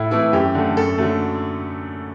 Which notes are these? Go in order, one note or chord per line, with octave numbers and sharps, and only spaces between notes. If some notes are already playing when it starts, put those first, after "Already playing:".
Already playing: A2 E4
E3 A3 E4
F#2 G4
D3 A3
F#2 A4
D3 F#3 A3